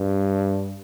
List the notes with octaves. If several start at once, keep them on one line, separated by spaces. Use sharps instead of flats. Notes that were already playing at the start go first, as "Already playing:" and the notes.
Already playing: G2